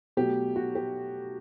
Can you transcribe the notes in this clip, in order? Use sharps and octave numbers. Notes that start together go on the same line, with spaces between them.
B2 F#3 A3 G4
F#4
G4